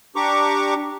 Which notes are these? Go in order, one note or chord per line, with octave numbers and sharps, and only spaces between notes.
D4 G4 A#5 C#6 D6